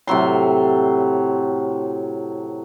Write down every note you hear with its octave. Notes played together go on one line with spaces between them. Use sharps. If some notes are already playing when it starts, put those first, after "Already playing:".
A2 C3 F#3 C6